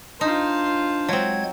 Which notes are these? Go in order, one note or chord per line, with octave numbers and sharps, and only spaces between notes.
D4 D#4 F4 C5
F#3 G#3 C4 G#6